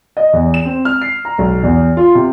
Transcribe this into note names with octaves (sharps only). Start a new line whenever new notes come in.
D#5
E2
E7
C4
F6
C7
A#5
B1
E2
F4
C3